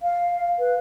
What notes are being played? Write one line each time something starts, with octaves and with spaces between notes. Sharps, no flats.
F5
B4